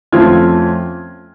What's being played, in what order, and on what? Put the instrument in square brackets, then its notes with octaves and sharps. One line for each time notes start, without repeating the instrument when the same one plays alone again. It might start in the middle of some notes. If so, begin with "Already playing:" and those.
[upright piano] F2 F3 A3 C#4 F4 F6 G#6